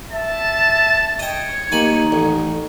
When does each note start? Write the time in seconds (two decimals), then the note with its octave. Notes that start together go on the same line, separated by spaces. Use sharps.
0.11 E5 A5
1.19 C#5 D#5 G5
1.72 D#2 D#4 G#5 B5
2.12 A1